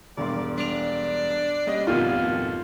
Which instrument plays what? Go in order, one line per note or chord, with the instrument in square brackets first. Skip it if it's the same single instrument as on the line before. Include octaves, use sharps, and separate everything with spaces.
[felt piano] E1 G2 C6 [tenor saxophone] D5
[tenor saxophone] D4 [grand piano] D7 F7
[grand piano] G3 C#4 D#5
[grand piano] G#1 F2 B2 [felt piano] A3 G4 A#4 [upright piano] F4